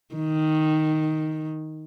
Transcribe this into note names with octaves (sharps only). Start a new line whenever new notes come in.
D#3